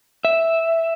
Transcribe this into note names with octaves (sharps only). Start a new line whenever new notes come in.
E5